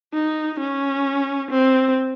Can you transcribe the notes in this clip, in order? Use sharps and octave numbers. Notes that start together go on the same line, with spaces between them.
D#4
C#4
C4